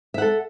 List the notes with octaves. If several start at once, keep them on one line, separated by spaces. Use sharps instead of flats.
A4 E5 F#5